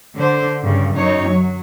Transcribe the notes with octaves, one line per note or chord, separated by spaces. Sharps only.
D3 C5
G2 C#3
F#2 D#4 C#5
F#3